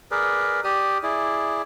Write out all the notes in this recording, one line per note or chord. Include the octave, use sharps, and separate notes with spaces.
G#4 A#4 B4 D5
G4 D5 D#6
E4 G#4 D5